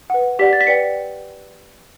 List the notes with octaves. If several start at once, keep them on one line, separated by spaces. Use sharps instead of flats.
B4 F#5
G4 D5 F#5 B6
A6
B6
B4 D5 G5 C#7